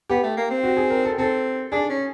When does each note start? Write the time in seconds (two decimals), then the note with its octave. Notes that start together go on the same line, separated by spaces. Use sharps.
0.09 B3 G4
0.23 A3
0.37 A#3
0.50 C4
0.63 F#4
0.77 G#4
0.90 A#4
1.05 A4
1.18 C4 A4
1.72 D4 G#4
1.90 C#4